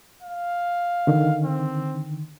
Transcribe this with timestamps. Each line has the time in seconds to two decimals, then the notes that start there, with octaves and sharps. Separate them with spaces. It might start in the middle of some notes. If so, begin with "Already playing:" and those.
0.22 F5
1.07 D3 D#3
1.44 C4